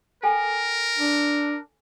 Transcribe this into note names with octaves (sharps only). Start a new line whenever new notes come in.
A4 A#4 G5 G#5
D4